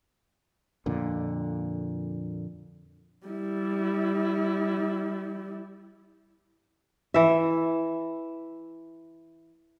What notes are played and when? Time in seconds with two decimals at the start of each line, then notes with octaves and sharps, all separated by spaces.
0.86 F2 A#2 D3
3.27 G3 E4
7.14 E3 E5